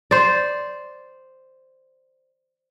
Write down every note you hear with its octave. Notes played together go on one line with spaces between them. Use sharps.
C5 D5